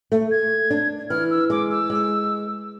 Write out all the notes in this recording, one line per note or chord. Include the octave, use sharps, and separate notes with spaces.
A3
G#6
D4
E3 F6
E6
G#3 D6
E6
G#3